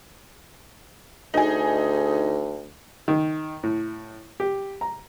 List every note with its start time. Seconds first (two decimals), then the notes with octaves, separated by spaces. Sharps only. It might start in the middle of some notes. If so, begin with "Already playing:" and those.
1.34 D2 D#4 G#4
3.08 D#3
3.63 A2
4.40 G4
4.81 A#5